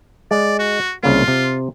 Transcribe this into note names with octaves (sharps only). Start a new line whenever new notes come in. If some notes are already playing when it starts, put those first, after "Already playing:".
G#3 D5
F#4
C2 C#3 A#3 F4
C3